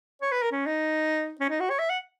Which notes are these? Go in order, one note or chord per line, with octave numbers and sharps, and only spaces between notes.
C#5
B4
A#4
C#4
D#4
C#4
D#4
F#4
C#5
E5
F#5